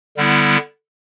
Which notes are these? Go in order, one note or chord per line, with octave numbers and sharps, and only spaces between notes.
D3 G3 B3 E4